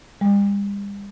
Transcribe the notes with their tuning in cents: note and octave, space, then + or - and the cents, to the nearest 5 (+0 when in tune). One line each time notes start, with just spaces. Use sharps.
G3 +45